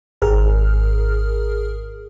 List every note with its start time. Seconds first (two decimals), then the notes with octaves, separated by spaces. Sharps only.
0.22 G#1 G#4 A#4 F6